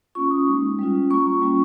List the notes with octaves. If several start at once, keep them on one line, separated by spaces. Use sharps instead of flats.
A#3 C#4 F4 C#6
D#6
G#3 D#4
G3 C#4 F4
A#3 F4 C#6
G3 C#4 F4